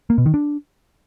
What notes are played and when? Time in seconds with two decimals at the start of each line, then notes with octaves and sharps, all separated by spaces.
0.10 A#3
0.18 B2
0.26 D#3
0.34 D4